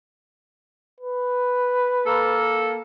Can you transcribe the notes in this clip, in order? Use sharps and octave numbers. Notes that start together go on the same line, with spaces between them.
B4
A#3 A4